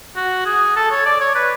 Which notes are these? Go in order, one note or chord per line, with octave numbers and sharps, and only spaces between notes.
F#4
G#4
A4
C#5
D5
C#5
B4